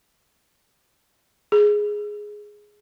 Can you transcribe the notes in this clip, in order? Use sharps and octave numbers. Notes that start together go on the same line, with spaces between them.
G#4